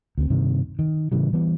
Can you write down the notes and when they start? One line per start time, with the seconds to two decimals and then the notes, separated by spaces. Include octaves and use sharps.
0.18 D2 C4
0.30 G2 C3 D#3
0.79 D#3
1.12 A2 C#3 E3 G3
1.33 E3 G3 B3